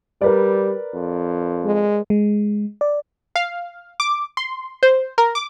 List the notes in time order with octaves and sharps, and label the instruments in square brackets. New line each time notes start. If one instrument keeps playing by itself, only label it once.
[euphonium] G3 [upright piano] A#4 B4 D5
[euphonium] F2
[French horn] G#3
[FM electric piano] G#3
D5
[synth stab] F5
D6
C6
C5
A#4
D6